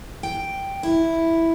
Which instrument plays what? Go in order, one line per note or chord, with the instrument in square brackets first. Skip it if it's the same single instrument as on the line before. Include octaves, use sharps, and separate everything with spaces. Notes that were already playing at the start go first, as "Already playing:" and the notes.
[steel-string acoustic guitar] G5
E4